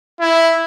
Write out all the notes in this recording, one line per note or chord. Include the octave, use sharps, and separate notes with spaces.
E4